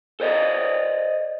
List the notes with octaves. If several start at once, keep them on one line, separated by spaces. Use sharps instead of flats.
A4 C5 D5 D#5